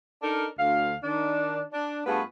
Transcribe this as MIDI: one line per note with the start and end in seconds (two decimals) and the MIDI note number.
0.22 0.46 62
0.22 0.46 63
0.22 0.46 69
0.22 0.46 70
0.58 0.95 38
0.58 0.95 77
1.03 1.63 51
1.03 1.63 62
1.73 2.01 62
2.06 2.21 43
2.06 2.21 57
2.06 2.21 59
2.06 2.21 65
2.06 2.21 68
2.06 2.21 71